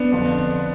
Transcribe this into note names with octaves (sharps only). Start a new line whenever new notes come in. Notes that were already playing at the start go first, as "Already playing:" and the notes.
Already playing: B3 D4
F2 D3 F3